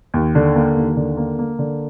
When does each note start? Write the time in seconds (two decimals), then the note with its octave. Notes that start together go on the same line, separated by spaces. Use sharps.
0.14 D#2
0.35 D3
0.55 A#3
0.76 D#2
0.96 D3
1.17 A#3
1.39 A#3
1.59 D3